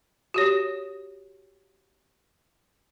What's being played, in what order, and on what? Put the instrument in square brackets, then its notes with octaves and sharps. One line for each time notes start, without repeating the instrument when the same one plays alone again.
[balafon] F#4 G4 C#5